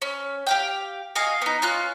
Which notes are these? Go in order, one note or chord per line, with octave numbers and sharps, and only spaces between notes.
C#4
G4 F5 G5
F#4 D#5 F5 G#5
B3 D#4
C#4 F4 F6 F#6